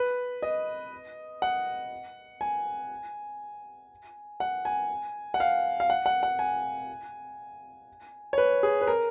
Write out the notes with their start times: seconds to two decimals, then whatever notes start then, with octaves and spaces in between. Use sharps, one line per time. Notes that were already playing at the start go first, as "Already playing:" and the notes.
Already playing: B4
0.42 D#5
1.42 F#5
2.41 G#5
4.40 F#5
4.65 G#5
5.34 F#5
5.40 F5
5.80 F5
5.90 F#5
6.06 F#5
6.23 F#5
6.39 G#5
8.33 C#5
8.38 B4
8.63 G#4
8.81 B4
8.87 A#4